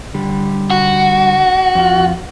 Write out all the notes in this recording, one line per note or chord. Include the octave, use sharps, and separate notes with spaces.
D3 G3 G4
F#4
F2 F4